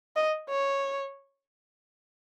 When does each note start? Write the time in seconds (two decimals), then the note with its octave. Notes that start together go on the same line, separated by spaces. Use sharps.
0.16 D#5
0.49 C#5